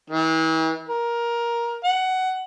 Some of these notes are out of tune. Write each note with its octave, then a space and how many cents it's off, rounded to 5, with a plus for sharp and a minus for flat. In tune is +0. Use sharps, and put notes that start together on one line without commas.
E3 -40
A#4 +15
F#5 +15